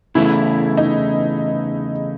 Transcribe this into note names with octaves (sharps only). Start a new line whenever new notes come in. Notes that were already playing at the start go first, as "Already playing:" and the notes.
E2 C#3 A3 E4
D#4